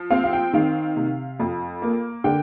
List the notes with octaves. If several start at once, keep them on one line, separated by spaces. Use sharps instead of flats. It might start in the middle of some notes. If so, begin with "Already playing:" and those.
Already playing: F3
C4 F5
F5
G5
D#3 F5
C3
F2
A#3
D3 G5